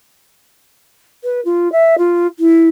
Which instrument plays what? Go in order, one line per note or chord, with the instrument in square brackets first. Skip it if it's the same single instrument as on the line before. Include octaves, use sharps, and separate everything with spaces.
[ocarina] B4
F4
E5
F4
E4